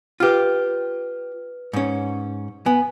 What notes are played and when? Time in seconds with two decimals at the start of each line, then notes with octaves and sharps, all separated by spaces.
0.20 F4 G4 B4 F6
1.73 G#2 C#4
2.66 B3 G#5